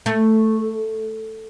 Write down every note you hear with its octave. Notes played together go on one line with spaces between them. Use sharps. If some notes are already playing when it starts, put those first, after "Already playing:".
A3